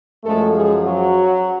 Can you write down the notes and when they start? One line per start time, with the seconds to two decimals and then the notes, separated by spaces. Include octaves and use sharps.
0.24 F#2 F3 G#3 A3 A4
0.54 G#3 G#4
0.83 F#3 F#4